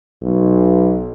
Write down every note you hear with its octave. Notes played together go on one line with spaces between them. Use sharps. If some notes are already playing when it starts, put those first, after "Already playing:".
B1